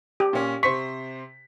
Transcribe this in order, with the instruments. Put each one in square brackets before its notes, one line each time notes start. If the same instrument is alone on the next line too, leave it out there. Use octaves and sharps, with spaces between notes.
[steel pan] G4
[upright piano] A#2 C#4
[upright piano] C3 C5 B6 [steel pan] C#6